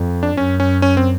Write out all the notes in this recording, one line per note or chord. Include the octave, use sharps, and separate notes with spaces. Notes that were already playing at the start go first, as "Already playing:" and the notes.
Already playing: F2
D4
F#2 C#4
C#4
C#4
C4